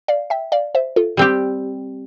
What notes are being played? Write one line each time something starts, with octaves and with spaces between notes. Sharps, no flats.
D5 F5
E5 G5
D5 F5
C5 E5
F4 A4
G3 C4 G4